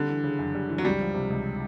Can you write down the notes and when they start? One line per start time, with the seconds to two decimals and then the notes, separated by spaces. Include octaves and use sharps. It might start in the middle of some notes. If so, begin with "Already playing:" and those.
Already playing: D3 G3
0.09 E3
0.24 C#3
0.39 F#2
0.55 G3
0.69 E3
0.78 F#3
0.84 C#2 G3
1.00 F3
1.14 C3
1.30 C#2